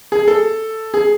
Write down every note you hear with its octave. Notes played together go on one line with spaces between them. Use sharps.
G#4
A4
G#4